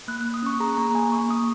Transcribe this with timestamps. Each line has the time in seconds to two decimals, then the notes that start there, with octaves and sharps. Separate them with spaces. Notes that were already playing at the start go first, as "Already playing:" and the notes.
0.08 A#3 F#6
0.21 A#3 F#6
0.34 D#6
0.43 C#4 C#6
0.60 G#4 A#5
0.77 A#3 A#5
0.95 A#3 G#5
1.12 A#3 C#6
1.29 A#3 D#6